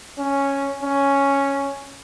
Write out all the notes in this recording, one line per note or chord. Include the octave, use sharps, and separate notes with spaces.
C#4
C#4